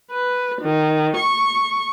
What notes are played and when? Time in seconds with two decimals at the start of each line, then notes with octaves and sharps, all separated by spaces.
0.12 B4
0.62 D#3
1.16 C#6